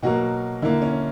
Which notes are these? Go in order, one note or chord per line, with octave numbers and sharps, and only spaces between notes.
B2 F#3 A#3 F#4
D3 A#3 E4
C#4